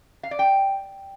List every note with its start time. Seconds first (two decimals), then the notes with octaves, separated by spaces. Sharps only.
0.23 F5
0.31 D5
0.39 G5